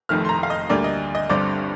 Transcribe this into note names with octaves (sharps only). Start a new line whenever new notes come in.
F1 F2 D#3 A3 F6
C6
A#5
F5
D#5
D2 D3 G3 A#3 D5
D#5
D#5
G1 G2 D3 G3 C4 D5